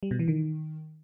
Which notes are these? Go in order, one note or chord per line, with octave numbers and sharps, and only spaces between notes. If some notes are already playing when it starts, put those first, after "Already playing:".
G3
B2
E3
D#3